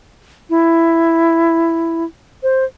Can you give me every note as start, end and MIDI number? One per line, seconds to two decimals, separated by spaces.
0.50 2.04 64
2.43 2.64 72